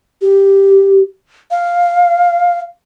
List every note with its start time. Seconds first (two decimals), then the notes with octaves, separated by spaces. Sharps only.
0.22 G4
1.51 F5